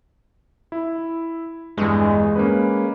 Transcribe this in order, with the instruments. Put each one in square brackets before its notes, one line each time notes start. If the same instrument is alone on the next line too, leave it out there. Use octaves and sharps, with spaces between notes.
[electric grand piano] E4
[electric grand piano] E2 G2 [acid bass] G#3
[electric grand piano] A#3 C#4 B4